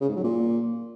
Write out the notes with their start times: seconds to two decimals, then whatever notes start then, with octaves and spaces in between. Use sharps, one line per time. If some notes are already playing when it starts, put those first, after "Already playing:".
0.01 C#3
0.09 G#2
0.16 F#3
0.24 A#2